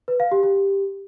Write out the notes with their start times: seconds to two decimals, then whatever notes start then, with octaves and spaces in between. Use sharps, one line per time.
0.08 B4
0.20 F5
0.31 G4
0.43 G4